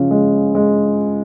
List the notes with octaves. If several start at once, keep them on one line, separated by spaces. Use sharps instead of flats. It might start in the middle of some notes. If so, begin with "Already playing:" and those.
Already playing: C#3 F3
G#3
G#3